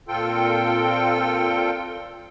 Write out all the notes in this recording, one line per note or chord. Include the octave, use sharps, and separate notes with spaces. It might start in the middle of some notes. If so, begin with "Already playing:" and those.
A#2 C4 F4 A4 G5